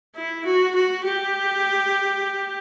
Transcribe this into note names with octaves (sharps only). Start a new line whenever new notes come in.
E4
F#4
F#4
G4